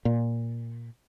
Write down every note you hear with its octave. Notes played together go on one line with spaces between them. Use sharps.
A#2